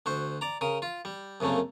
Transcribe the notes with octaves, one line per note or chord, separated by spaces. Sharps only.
D2 F#4 C5
D5 A#5
C#3 A#4 D#6
F4
G3
C2 F#2 C#3 A3 A#3